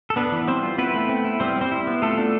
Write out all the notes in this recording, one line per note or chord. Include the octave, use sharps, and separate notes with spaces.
A4
B3 D4 B4
E3
G3 C4 C5
F4
B3 E4 B4
A3
C4
E4
G3 C4 C5
G3
C4 C5
E4
B3
A3 F4 A4
D4